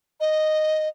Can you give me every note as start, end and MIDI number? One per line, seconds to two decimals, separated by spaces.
0.20 0.88 75